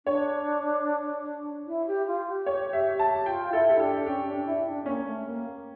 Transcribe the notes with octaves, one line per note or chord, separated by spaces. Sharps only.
D4 C#5
E4
G4
F4
G4
C#5
E5
A5
F4 G5
E4 A4
G4
D4 A4
C#4 G4
D4
E4
D4
A#3 C#4
A3
A#3